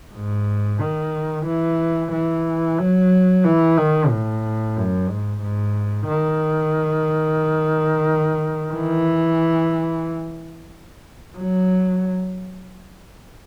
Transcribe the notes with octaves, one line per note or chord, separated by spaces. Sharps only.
G#2
D#3
E3
E3
F#3
E3
D#3
A2
F#2
G#2
G#2
D#3
E3
F#3